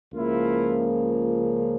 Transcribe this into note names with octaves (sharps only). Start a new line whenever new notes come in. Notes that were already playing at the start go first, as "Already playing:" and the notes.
C#2 C#3 F3 A#3 E4 F4